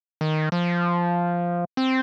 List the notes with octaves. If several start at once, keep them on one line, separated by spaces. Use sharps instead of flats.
D#3
F3
C4